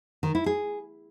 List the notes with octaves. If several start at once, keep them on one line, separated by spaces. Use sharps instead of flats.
D#3
E4
G#4